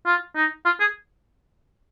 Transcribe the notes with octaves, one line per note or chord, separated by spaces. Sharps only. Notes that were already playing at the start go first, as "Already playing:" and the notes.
F4
D#4
F4
G#4